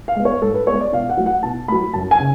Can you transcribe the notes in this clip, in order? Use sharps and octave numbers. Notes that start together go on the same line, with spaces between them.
F5
G#3 B3
C#5
G#2 A4
B4
G#3 B3 C#5
D5
B2 F5
F#5
F#3 A3
F#5
B2 A5
F#3 A3 B5
F#2 A5
G#5
C#3